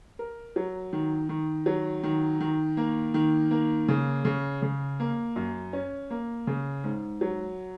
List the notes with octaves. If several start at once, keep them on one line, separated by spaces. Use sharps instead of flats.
A#4
F#3
D#3
D#3
F#3
D#3
D#3
A#3
D#3
A#3
C#3
C#3
C#3
A#3
F#2
C#4
A#3
C#3
G#2
F#3